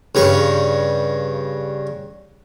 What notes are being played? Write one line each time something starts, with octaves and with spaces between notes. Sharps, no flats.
G2 C#3 C#6